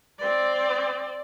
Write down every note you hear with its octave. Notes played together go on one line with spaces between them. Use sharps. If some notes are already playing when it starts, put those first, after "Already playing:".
C4 D5